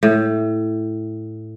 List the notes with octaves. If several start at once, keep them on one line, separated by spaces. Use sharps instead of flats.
A2